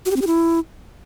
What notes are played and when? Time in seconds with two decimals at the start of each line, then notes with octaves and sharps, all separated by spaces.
0.06 F#4
0.11 G4
0.16 C4
0.22 G4
0.27 E4